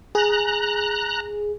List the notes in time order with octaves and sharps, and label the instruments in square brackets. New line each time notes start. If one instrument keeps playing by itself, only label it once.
[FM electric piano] G#4 [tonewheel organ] A#5 F#6